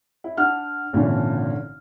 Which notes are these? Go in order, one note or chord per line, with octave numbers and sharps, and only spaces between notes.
E4
D4 F#5 F6
G#1 A#2 D3 E3 C#4 D4